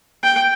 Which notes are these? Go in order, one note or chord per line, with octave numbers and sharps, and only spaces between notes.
G5